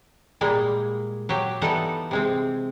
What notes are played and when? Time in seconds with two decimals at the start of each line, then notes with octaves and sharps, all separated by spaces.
0.41 A#2 G3 G#3 A#3
1.29 F#3 G4
1.61 E3 G3 B3 D#4 A4 F#5
2.11 C3 G#3 C4